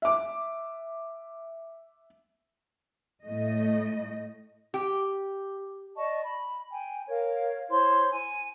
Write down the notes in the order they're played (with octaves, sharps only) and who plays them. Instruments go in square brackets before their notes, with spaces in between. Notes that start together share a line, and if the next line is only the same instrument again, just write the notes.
[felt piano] E5 D6
[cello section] A2 A3 D#5
[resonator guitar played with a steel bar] G4
[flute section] D5 D#5 A5 C#6
B5
G5 G#5
A#4 C#5 F5
E4 C5 C#5 C6
G#5